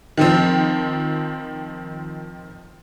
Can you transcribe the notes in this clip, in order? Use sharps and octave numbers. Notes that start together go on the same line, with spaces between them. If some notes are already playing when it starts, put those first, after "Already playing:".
D#3 F3 C4